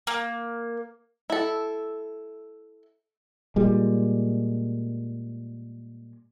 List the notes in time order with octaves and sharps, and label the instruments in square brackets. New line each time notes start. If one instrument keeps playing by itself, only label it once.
[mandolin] A#3
[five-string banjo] E4 A4
[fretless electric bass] A#2 G3 G#3